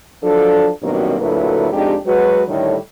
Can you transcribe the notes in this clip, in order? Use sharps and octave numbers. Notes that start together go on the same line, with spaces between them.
F3 F#3 D4 A4
G2 B2 D#3 F#3 A#3 C4
D2 A#2 F#3 E4 A4 B4
F2 G#3 D4 D#4 G4
F#3 G#3 F#4 B4
A2 D3 D#3 G3 A4 C#5